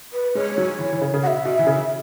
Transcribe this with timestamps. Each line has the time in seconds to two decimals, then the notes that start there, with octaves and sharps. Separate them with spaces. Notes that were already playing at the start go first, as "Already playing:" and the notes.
0.13 B4
0.35 G#3 C#5
0.52 G#3
0.58 F#3
0.79 E3
0.93 E3
1.02 C#3
1.14 C#3
1.23 B2 F#5
1.27 E5
1.45 B2
1.59 E3
1.67 C#3